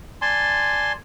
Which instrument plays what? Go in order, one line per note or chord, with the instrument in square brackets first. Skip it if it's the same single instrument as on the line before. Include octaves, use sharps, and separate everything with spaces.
[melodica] D5 G#5 A5 C6